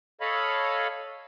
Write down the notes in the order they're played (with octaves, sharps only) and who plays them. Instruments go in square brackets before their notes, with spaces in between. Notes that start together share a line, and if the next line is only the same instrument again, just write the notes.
[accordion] A4 C#5 D#5 F5 B5